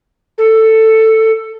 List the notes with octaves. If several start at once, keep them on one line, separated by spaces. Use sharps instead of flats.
A4